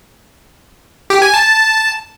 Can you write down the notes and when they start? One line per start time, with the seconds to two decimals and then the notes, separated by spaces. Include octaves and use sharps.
1.10 G4
1.22 G#5
1.34 A5